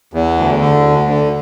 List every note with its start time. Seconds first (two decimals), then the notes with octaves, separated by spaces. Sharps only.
0.13 E2
0.38 D2
0.61 D3
0.85 D2
1.10 D3